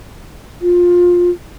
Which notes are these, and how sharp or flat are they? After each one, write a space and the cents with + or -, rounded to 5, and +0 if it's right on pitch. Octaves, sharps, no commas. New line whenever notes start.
F4 +15